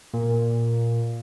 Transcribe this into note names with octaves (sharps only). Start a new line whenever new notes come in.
A#2